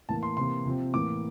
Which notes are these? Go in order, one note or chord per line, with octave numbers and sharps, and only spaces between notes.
A2 E3 A#3 A5
C6
C3 E3 A#3 C6
C3 F3 C4
A2 E3 A#3 D6